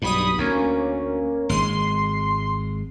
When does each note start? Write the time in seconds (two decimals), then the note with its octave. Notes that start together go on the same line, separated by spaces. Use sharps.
0.02 B1 G2 B5 D#6
0.38 D2 A#3 C#4
1.49 G#1 G#3 C6